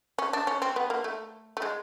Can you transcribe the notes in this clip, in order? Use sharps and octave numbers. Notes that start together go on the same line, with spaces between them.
C#4
D4
C#4
C4
B3
A#3
A3
A3
G#3